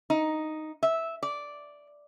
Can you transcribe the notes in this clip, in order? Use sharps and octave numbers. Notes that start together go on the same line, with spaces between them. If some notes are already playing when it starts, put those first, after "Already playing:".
D#4
E5
D5